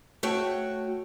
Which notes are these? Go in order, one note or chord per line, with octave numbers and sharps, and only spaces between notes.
A3 F#4 C#5 G5